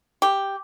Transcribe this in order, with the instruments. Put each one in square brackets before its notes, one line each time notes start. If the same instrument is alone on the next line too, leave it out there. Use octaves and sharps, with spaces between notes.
[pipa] G4